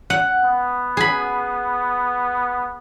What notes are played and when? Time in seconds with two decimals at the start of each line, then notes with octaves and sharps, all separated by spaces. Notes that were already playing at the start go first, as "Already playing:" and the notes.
0.10 F#5
0.44 B3
0.97 G#4 B5